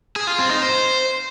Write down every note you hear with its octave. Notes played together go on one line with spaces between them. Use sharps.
G#4
F4
C4
D#4
C5